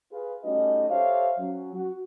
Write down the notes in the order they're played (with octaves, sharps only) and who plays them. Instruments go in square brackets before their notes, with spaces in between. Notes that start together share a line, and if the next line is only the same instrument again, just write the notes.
[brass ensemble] F4 G#4 B4
G3 A3 C#4 D#4 F#4 D#5
G4 A4 C5 C#5 E5 F5
F#3 C#4
F#4